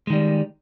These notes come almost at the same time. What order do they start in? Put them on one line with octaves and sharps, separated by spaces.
G#3 D#3 G3